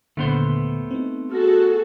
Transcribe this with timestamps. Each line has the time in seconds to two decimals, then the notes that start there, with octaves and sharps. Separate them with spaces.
0.17 D#2 A#2 D3 A3 B3 C5
0.91 C4 D#4
1.32 F#4 G#4 A4 F6 A#6